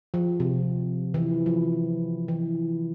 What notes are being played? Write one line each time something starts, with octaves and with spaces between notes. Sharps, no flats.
F3
C3
E3
F3
E3